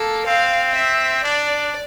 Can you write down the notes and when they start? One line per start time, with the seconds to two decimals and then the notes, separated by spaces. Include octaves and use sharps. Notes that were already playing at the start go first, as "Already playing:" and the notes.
Already playing: A#3 A4
0.26 C4 F5
0.75 E5
1.24 D4 D5